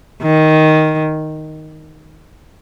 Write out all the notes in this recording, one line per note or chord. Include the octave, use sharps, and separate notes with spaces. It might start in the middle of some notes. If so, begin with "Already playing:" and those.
D#3